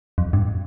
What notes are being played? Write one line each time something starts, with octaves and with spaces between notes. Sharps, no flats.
F2
G2